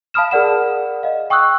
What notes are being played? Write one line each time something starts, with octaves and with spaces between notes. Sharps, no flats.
F5 A5 B5 D#6 F6 E7
G#4 A#4 D5 F#5 E7
D#5 F5
G5 C#6 D#6 E6 F#6